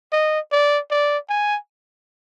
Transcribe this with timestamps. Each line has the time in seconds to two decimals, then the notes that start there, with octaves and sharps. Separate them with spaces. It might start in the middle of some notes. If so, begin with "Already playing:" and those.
0.12 D#5
0.51 D5
0.90 D5
1.29 G#5